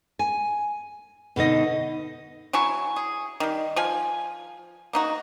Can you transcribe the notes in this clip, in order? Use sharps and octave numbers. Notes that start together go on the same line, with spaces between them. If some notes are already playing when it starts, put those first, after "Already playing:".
G#5
B2 D3 D#4 D#5
F#3 E4 G#5 C#6
G#4
D#3 G3
F3 F4 G#5
A#3 D#4 F#4